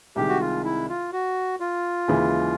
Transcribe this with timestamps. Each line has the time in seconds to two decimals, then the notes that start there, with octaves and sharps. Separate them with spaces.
0.16 C2 C3 D#3 G#3 G4
0.29 F#4
0.40 F4
0.65 E4
0.89 F4
1.12 F#4
1.60 F4
2.08 D#2 C#3 E3 G#3